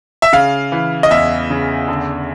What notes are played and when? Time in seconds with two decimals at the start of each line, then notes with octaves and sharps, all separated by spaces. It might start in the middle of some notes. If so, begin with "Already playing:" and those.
0.22 E5
0.33 C#3 F5
0.72 E3
1.03 D#5
1.10 E2 E5
1.50 C#3
1.88 D3